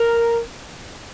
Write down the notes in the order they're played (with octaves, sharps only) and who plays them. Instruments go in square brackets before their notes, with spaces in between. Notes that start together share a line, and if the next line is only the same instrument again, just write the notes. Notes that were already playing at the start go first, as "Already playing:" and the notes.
Already playing: [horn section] A#4